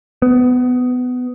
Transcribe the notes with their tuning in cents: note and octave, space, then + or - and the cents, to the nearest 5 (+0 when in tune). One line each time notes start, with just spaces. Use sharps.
B3 +20